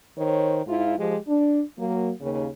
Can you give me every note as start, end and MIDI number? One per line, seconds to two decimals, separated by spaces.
0.17 0.60 51
0.17 0.60 72
0.17 0.60 73
0.66 0.95 44
0.66 0.95 64
0.66 0.95 65
0.98 1.16 53
0.98 1.16 56
0.98 1.16 67
1.28 1.60 62
1.78 2.10 54
1.78 2.10 58
2.21 2.47 39
2.21 2.47 49